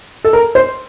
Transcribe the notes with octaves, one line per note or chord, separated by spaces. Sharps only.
A4
A#4
C5